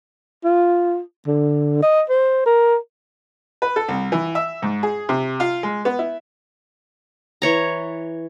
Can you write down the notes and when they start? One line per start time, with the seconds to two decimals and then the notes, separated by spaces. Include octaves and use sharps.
0.44 F4
1.27 D3
1.83 D#5
2.10 C5
2.46 A#4
3.62 B4
3.76 A4
3.88 C2
4.12 E3
4.35 E5
4.62 G#2
4.83 G#4
5.09 C3
5.40 F4
5.63 G#3
5.85 B3
5.99 E4
7.42 E3 C#5 A#5